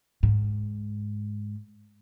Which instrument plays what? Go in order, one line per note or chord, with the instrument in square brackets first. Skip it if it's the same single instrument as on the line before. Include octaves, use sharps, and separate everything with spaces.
[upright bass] G#2